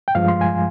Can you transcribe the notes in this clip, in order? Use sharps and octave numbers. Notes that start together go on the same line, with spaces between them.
G5
G2 F3 G#3 F5
C6
G#5